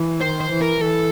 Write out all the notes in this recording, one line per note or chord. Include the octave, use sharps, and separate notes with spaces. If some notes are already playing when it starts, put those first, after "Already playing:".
Already playing: E3
D#3 C5
C5
E3
A#4
E3 A4